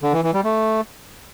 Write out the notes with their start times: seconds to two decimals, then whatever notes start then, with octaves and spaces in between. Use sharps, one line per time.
0.03 D3
0.13 E3
0.23 E3
0.34 G3
0.44 A3